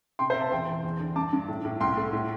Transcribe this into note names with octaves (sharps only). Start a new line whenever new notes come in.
C3 G5 C6
C5 E5
C3
E5 A5
E2 G5 C6
E2
E2
D3
G2 A5 D6
G2
A2
A2
C2 G5 C6
A3
A2